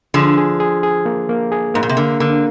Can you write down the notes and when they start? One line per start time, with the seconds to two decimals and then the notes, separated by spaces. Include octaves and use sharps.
0.14 D3 F3 G#4
0.37 G#4
0.60 G#4
0.83 G#4
1.06 A#3
1.29 A#3
1.52 G#4
1.74 G#2 A#3
1.83 A#2
1.89 C3
1.97 D3 A#3
2.20 D3 A#3